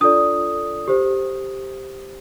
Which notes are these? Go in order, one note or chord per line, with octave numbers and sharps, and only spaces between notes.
D4 F4 A4 D5 D#6
G4 C5